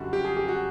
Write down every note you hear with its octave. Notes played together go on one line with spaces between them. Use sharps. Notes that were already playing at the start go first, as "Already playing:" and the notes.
Already playing: F#2 D3 G3 F#4
G4
G#4
G4
F#4